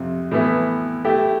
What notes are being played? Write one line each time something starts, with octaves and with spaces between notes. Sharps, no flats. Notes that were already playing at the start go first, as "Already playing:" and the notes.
Already playing: F2 C3
A2 E3 B3 E4
A3 E4 G4